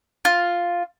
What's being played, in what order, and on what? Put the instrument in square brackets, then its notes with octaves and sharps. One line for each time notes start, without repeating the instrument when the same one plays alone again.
[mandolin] F4